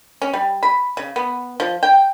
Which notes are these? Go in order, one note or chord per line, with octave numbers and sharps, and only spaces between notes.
C#4
G3
B5
C#3
B3
F3
G5